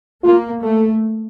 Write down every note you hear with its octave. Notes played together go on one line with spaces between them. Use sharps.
A#3 F4
A3 A4